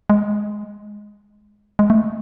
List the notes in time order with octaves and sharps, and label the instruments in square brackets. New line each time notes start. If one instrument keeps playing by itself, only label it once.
[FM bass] G#3
G#3
A3